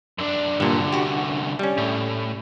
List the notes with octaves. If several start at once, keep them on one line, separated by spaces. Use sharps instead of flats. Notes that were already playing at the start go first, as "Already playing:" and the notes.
F#2 D4
C2 G2 A#2 D3
F#4 G4
G3 C#4
A2